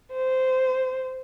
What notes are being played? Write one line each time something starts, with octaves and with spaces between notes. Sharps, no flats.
C5